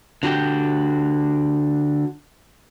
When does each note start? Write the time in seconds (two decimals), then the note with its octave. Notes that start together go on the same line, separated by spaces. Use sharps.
0.23 D3 F#4 G4 G5